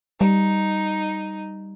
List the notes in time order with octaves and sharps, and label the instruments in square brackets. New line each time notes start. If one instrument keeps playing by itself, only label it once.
[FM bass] G3 [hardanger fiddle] D#4